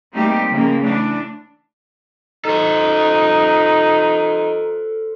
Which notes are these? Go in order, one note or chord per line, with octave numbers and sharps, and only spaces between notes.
G3 A3 A#3 C4 D#4 G4
C#3 F3 A#3
E3 A3 D4
D#4 A4 C5